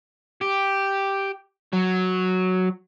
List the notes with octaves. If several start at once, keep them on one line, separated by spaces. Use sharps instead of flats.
G4
F#3